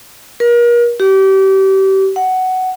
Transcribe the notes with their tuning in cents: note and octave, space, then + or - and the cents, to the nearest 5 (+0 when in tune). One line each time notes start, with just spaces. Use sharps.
A#4 +35
G4 -30
F#5 +10